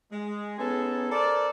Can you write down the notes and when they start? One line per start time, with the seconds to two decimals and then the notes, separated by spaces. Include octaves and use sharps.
0.11 G#3
0.59 B3 C#4 D#4 G#4 A4
1.12 A4 A#4 C5 D5